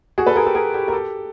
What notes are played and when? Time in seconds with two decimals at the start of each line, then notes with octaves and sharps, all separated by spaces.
0.18 F#4 G#4
0.27 A4 B4
0.36 G#4 A#4
0.45 G4 A4
0.55 G#4 A#4
0.74 G4 A4
0.88 A#4
0.93 G4 A4